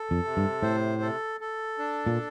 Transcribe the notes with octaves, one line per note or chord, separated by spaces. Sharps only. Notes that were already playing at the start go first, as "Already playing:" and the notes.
Already playing: A4
F2
C3
G2
A2 C5
A4
A4
D4
A#2